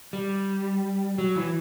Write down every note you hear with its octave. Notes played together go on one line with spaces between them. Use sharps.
G3
F#3
E3